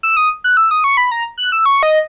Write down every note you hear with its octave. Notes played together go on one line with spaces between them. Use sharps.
E6
D#6
F#6
E6
D#6
C#6
B5
A#5
F#6
E6
C#6
D#5